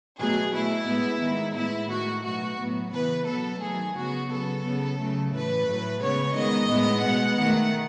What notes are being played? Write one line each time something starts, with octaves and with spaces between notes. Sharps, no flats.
B2 F#3 A3 G#4
B2 A3 E4
A2 G#3 B3
D#3 G#3 B3
A2 G#3 B3 E4
D#3 A3 F#4
B2 F#3 A3 F#4
A2 F#3 B3
C#3 E3 B3 B4
B2 F#3 B3 A4
D#3 F#3 A3 G#4
C#3 F#3 B3 F#4
C#3 F#3 B3 A4
C#3 F#3 B3
C#3 F#3 A3
A2 E3 A3 B4
A2 F#3 A3
C#3 G#3 B3 C#5
D#3 G#3 B3 D#5
A2 G#3 B3
B2 G#3 B3 F#5
D#3 A3 F#5